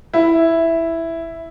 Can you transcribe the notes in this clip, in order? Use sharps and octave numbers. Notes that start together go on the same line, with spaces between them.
E4